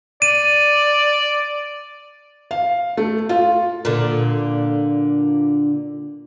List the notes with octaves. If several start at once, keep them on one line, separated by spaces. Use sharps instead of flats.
D5 D#7
F5
A3
F4
A#2 D3